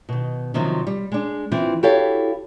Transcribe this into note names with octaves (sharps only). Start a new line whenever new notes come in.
B2 D#3
C3 D#3 F3 F#3 C4
G3
G#3 D4
E3 C4 F4
E4 F#4 G4 A4 C#5 F5